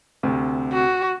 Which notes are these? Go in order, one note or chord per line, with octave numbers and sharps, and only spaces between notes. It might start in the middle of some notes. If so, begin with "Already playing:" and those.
D2 C3
F#4